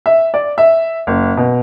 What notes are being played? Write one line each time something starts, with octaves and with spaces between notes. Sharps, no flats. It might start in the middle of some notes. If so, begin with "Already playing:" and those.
E5
D5
E5
F#1
B2